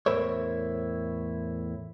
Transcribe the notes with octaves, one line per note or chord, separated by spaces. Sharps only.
E2 A2 E4 A#4 C5 C#5